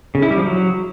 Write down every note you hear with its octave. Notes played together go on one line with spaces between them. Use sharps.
C#3
E4
G3
F3
F#3